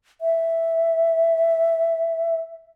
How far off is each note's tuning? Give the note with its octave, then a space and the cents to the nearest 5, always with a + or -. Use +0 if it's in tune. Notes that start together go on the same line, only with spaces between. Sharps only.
E5 +0